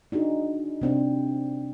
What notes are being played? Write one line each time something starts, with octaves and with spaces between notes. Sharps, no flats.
D4 D#4 F#4 G#4
C3 C4 D4